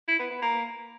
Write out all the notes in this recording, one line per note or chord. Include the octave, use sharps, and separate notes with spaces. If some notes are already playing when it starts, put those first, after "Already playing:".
E4
B3
B3
A#3